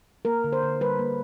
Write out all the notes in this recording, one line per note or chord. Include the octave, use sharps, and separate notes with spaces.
A#3 A#4
D3
C5
D3
G3 B4
A#3